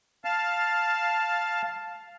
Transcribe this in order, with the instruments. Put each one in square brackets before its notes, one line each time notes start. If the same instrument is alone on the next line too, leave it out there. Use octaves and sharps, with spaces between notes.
[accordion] F5 A5